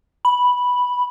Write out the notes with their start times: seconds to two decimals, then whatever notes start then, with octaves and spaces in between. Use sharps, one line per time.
0.25 B5